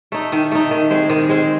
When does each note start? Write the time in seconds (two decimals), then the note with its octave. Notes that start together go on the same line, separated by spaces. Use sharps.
0.12 A3 D#4
0.32 D#3
0.52 A3 D#4
0.71 D#3
0.91 G#3 C4
1.10 D#3
1.29 G#3 C4